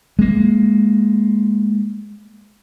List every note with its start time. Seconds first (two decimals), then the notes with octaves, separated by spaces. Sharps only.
0.19 G#3 A#3